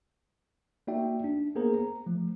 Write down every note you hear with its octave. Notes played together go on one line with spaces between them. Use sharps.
A#3 D#4 F#4 D5 E5 G5
D4
A#3 B3 G#4 A#4 C5 A#5
A#5
F3 A3